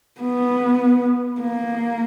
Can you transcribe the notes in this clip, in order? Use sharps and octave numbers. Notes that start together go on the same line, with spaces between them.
B3
A#3